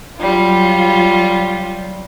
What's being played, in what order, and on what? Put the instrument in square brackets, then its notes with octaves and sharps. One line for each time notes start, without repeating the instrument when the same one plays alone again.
[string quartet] F#3 G3 F4